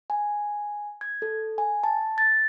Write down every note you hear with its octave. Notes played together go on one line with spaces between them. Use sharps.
G#5
G#6
A4
G#5
A5
A6